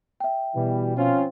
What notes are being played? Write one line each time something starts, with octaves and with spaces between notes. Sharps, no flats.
E5 G5
B2 E3 G3
F3 C4 C#4 F4